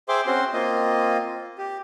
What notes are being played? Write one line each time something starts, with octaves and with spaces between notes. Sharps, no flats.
G#4 C5 E5 G5 C6 D6
C4 C#4 F#4 C5 C6
A#3 C4 F4 D#5
G4